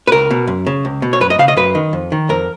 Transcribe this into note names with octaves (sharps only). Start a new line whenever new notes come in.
B4
C#2 A#4
B2
F#2
C#3
C#2
B2
C#5
F#2 B4
D#5
C#3 F5
D#5
F#2 B4
D#3
F2
D#3
F2 A#4